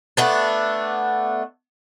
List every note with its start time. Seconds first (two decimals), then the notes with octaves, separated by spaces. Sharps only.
0.17 A3 B3 D4